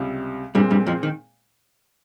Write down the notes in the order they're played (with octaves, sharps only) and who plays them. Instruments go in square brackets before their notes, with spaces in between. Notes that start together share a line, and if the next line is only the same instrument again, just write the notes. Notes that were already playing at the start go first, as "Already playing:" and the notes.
Already playing: [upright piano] C#2 C3 G3
[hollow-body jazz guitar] G2 G3 [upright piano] A#2 G#3 C4
[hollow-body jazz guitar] G2 G3
F2 F3
D#3